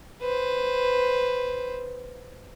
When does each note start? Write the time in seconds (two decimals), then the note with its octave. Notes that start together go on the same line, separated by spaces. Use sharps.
0.22 B4 C5